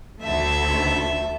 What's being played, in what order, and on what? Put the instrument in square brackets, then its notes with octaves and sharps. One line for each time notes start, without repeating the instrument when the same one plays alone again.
[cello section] D2 A3 [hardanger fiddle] A4 E5